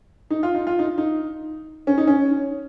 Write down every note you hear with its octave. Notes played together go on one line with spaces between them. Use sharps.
D#4
F4
D#4
F4
D#4
D#4
C#4
D#4
C#4